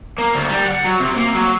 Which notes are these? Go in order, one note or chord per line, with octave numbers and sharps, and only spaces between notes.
A#3
D2
G3
F#5
F#3
C3
A#3
F#3